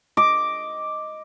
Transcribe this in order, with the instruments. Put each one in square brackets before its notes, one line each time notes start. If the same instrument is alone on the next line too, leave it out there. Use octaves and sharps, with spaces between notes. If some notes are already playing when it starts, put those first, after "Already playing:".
[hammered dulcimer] D#5 D6